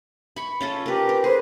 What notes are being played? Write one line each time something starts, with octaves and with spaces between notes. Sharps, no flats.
B5 C#6
C#4 F4 A4
G4 A#4 B4
A#4
G#4 B4 C5